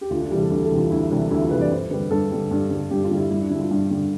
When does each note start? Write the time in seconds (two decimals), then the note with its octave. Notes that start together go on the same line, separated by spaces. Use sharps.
0.01 G4
0.10 D2 F4
0.21 D4
0.31 C3 E3 G3 G4
0.41 A4
0.50 D2
0.64 A4
0.71 C3 E3 G3
0.78 F4
0.91 D2 E4
1.11 C3 E3 G3 D4
1.31 D2 E4
1.41 F4
1.51 C3 E3 G3 B4
1.61 D5
1.71 G2 C5
1.91 D3 G3 B4
2.11 G2 A4
2.31 D3 G3
2.51 G2
2.71 D3 G3
2.91 G2 G4
3.04 F4
3.11 D3 G3
3.18 E4
3.31 G2 E4
3.41 D4
3.50 D3 E4
3.55 G3
3.60 F4
3.71 G2
3.91 D3 G3